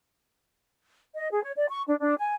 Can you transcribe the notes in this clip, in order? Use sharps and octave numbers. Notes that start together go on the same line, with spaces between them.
D#5
G#4
C#5
D5
C#6
D4
D4
G#5